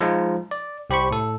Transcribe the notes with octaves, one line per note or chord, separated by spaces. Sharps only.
F3 G#3 D#4 F4
D5
C2 G4 C5 B5 C#6
A2 A4